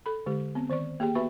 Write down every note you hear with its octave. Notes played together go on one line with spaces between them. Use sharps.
A4 B5
D3 G#3 G4
B3 C4
D#3 C5 D5 C#6
A#3 G4 G#4 G5
B3 F#4 B4 E5 B5 C#6